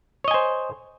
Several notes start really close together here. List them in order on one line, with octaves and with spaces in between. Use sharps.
C#5 D#5 G#5 C5